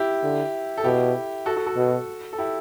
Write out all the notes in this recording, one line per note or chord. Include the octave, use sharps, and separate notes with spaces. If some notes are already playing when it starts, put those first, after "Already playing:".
Already playing: E4 G4
D3
A4
B2 E4 G4
F#4 A4
F#4 A4
F#4 A4
B2
A4
E4 G4